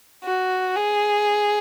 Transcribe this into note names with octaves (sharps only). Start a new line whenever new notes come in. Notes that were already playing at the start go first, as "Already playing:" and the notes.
F#4
G#4